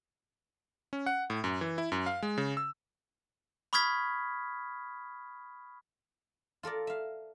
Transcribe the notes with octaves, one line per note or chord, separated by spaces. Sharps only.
C#4
F#5
A2
F#2
E3
E4
F#2
F5
G#3
C#3
E6
B5 C#6 D#6 F6 G#6 B6
F4 A4 A#4 D5
E5 F5